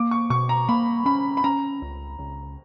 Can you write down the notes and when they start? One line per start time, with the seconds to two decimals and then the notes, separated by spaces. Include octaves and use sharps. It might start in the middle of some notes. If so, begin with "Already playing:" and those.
Already playing: A#3 D6
0.11 C#6
0.30 B2 C#6
0.49 A#5
0.68 A#3 B5
1.06 C#4 B5
1.37 B5
1.44 C#4 A#5
1.82 C#2
2.19 C#2